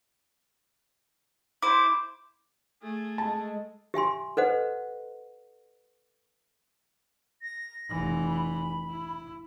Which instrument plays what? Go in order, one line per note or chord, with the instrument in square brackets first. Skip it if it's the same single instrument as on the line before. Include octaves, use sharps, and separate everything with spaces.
[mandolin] E4 C5 [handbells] D6
[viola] A3 G#4
[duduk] G#3 [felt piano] A5
[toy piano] G4 E5 G#5 C6
A4 B4 C5 D#5 F#5
[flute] A#6
[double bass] F1 E3
[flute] B5
[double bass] E4